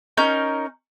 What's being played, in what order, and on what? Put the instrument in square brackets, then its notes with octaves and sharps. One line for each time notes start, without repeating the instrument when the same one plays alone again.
[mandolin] C#4 D#4 A#4 G6